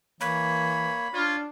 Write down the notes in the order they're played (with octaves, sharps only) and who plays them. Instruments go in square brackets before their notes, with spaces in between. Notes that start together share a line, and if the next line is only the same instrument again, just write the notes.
[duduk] E3 [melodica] A#3 C#5 [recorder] B5
[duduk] D4 [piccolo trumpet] F4 [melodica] C#5 D5